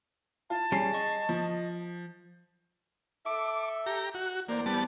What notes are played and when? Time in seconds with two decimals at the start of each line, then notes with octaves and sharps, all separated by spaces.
0.50 F4 A5
0.72 G3 C#4 G#4 C7
0.93 D#5 C#6
1.29 F3
3.26 A4 E5 D6
3.86 G4 A#5
4.14 F#4
4.49 E2 A#3 C5 D5
4.66 G3 B3 A5